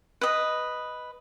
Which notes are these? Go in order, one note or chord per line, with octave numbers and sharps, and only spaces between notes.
B4 D#5